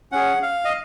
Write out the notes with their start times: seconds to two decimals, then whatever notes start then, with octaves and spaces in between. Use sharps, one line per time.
0.12 C#4 G#4 F#5
0.42 F5
0.65 D#5